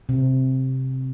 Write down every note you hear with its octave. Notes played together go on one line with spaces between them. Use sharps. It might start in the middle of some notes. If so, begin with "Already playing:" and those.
C3